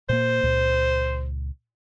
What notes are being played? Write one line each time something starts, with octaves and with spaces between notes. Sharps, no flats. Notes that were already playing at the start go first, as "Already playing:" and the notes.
A#2 A#3 C5
C#2 A#2